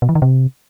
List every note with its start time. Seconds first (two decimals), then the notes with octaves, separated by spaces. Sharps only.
0.02 B2
0.09 E3
0.15 D#3
0.22 C3